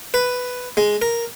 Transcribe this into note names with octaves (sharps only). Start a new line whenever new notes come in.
B4
G#3
A#4